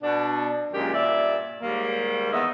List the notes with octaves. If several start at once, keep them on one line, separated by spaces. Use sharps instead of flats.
B2 D4
F#2 A#2 D#3 G#3 G4
G2 A#2 D5 E5
D#2 G#2 G3 A#3
E2 B3 D#4 E5